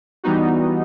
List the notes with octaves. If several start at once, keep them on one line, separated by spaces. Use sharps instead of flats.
E3 G3 B3 D#4 F#4